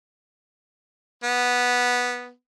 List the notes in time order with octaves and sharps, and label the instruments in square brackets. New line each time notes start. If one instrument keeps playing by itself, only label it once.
[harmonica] B3